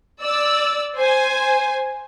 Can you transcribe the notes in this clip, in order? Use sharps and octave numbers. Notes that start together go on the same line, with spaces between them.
D5 E6
C5 G#5